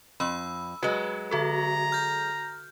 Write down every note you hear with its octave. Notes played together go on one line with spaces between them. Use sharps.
F2 B5 E6
F#3 G#3 F#4 B4
D3 F#4 A4 A#5
F6 G6